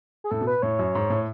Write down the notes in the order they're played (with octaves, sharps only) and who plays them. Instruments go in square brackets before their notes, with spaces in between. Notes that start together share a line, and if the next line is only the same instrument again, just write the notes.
[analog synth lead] G#4
[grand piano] A2 [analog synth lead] A4
[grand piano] B2
[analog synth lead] B4
[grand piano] A2 [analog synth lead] C#5
[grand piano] F#2
G#2
A2